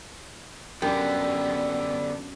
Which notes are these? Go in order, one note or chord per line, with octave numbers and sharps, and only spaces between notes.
F#2 D3 B3 D4 G4